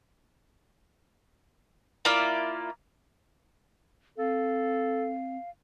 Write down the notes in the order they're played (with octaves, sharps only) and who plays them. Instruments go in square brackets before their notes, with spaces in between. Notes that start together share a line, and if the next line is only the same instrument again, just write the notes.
[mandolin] A#3 E4 F4 D5
[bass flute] C4 [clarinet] A4 [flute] F5